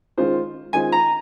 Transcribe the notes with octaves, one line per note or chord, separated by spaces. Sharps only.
D#3 G#3 C#4 F4 C5
D#3 G#3 C#4 F4 C5 G#5
A#5